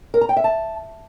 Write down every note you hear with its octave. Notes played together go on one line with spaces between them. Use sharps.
A#4
A#5
G5
E5
A5